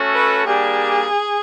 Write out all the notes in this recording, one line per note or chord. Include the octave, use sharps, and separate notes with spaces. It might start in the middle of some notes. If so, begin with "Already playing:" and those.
Already playing: A3 C#4 F#4 A4 C#5
B4
G3 A#3 D4 G4 G#4